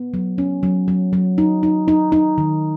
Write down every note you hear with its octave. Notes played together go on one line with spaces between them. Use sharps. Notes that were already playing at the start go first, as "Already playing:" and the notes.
Already playing: B3
F#3
C#4
F#3
F#3
F#3
D#4
D#4
D#4
D#4
D#3